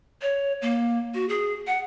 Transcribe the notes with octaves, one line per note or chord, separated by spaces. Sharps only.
C#5
A#3
F#4
G#4
F#5